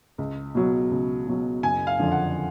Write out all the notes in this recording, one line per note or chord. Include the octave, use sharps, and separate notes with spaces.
C#2
B2 F#3
C#2
B2 F#3
F#1 G#5
F5
F2 D3 F3
F#5